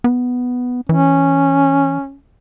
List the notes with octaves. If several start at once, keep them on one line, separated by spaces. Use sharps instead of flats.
B3
E3 C#4